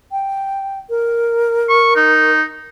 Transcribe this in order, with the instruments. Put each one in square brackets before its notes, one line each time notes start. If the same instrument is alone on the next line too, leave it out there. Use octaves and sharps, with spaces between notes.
[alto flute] G5
A#4
[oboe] C#6
D#4